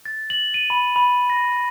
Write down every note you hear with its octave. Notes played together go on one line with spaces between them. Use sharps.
A6
F#7
D#7
B5
B5
A#6